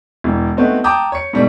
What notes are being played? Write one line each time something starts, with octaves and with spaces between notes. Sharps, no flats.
E1 E3
A3 B3 C4 D#4 F#4
G5 A5 A#5 D6 D#6 G6
C#5 C#7
G#2 B2 G3 A3